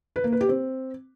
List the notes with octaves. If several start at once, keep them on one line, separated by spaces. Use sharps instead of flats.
B4
A#3
B4
G4
C4